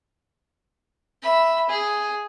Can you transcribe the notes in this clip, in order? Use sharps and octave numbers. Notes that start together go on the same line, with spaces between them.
E5 B5
G#4